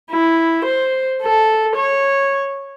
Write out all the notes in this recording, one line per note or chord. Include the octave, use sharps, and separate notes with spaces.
E4
C5
A4
C#5